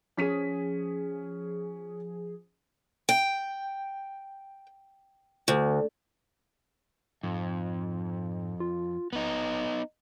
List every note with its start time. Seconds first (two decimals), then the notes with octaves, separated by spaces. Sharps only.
0.17 F3 C#4 G#4 B6 D#7
3.09 G5
5.48 D2
7.23 F2 G#2
8.60 F4
9.13 D1 B3 D#4